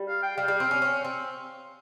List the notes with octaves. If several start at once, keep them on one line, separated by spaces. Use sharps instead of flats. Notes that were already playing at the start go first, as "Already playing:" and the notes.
Already playing: G3
F5
G5
G3 F5
G3
C4
C#4
C#4
C4